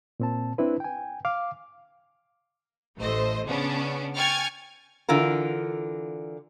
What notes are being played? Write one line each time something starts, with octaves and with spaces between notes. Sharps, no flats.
A#2 C4 A5
C4 D4 E4 B4
G5 G#5
F5 D6
A1 A3 C5 D#5
C#3 B3 C#4 D4
G5 G#5 C#6 F6 G#6 A6
D3 E3 F4 A#4